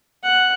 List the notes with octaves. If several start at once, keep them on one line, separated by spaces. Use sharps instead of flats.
F#5